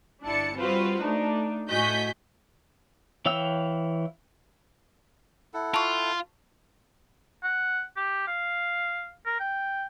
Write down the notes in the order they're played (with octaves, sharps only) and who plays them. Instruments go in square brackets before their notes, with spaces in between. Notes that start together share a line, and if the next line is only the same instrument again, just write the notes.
[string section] G1 D4 E4 A5 C#7
G3 C4 F4 F#4 B4 C5
A3 D4 D#4
A2 F#4 D#5 G#5 G6 B6
[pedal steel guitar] E3 C#5 F5 G5 E6
[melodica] E4 A4 F#5
[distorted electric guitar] F4 [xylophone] A5 C#6
[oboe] F#5
G4
F5
A#4
G5